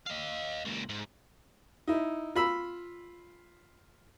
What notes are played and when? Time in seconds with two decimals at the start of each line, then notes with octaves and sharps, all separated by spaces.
0.07 D#5 F5
0.66 C#2 A#2
0.89 G#2
1.87 D#4 E4
2.35 F4 B5 E6